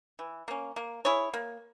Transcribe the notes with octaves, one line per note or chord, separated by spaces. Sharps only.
E3
A#3 C#4
A#3
E4 G#4 C#5
A#3